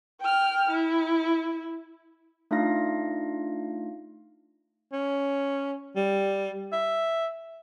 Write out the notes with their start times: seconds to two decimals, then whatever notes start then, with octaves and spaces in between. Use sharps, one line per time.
0.21 G5 F6
0.70 E4
2.51 A3 D4 D#4 F4 F5 A#6
4.93 C#4
5.96 G3
6.72 E5